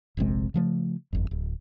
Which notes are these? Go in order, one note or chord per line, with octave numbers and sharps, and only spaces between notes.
F1 A#1 C3 G#3
C#3 F3 A3
G1 F2
D1